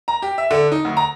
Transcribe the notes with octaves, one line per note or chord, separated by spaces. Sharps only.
A#5
G4
E5
D3
D#4
D2
A#5